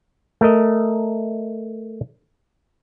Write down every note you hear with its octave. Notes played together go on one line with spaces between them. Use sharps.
A3 A#4 D#5